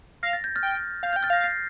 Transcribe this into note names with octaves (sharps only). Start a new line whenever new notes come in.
F5 A#6
A6
G6
F6 A6
G5
F5 G6
G6
G5
F6 A6
F5 G6 A#6
A6 C7